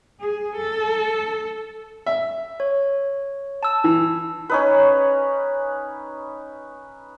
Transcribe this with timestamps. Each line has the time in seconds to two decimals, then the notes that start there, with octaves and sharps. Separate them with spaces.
0.21 G#4
0.56 A4
2.06 E5
2.60 C#5
3.63 A5 E6
3.84 E3
4.49 C#4 D#4 B4